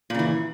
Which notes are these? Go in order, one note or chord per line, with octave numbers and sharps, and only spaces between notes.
A#2 C#3 E3